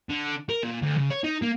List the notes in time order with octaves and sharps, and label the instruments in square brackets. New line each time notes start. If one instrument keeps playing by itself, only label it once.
[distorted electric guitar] D3
A#4
A#2
D2
C#3
C#5
D#4
A#3